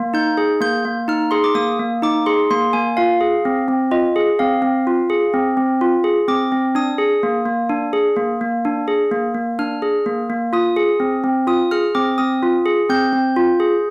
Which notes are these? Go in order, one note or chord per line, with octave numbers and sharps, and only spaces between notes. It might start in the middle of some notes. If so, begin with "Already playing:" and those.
Already playing: A#3
D#4 G6
G#4
A#3 G6
A#3
D#4 F6
G#4 C6
D6
A#3 D#6
A#3
D#4 D6
G#4 C6
A#3 C6
A#3 G#5
F4 F5
G#4
C4
C4
F4 D#5
G#4
C4 F5
C4
F4
G#4
C4
C4
F4
G#4
C4 D6
C4
D4 D#6
G#4
A#3
A#3
D4
G#4
A#3
A#3
D4
G#4
A#3
A#3
D4 F6
G#4
A#3
A#3
F4 D#6
G#4
C4
C4
F4 D#6
G#4 F6
C4 D6
C4 D#6
F4
G#4
C4 G6
C4
F4
G#4